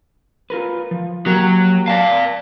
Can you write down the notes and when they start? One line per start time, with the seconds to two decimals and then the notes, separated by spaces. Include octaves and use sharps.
0.50 F4 A#4 B4
0.91 F3
1.26 F#3 A#3 G4 A#4
1.88 D5 F5 A5